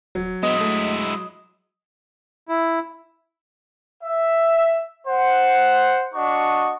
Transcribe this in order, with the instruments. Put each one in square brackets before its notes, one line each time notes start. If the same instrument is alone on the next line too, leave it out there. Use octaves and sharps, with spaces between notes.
[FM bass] D#1 [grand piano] F#3
[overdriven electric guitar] G#3 E4 [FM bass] B3 [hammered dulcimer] D#5
[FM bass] A3
[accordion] E4
[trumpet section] E5
C5 F#5
D4 F#4 D#5 C#6